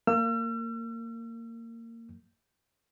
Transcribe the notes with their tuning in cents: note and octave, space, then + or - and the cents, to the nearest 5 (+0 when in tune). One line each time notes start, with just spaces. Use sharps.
A#3 -20 E6 +45